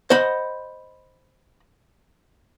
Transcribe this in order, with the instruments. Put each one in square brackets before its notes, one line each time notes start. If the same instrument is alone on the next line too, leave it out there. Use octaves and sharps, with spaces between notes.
[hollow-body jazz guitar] C5 D#5 F#5 B5